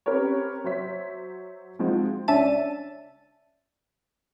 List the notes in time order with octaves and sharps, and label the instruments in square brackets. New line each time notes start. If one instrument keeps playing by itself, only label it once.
[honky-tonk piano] C4 C#4 G4 A#4 B4 C#5
F#3 C5 C#5 E5 B6
F3 G#3 C4 D#4 F4 F#4
[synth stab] C#2 C#4 D4 E5 A5 D#7